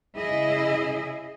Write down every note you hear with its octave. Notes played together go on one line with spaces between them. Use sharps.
C#3 E4 G#4 D#5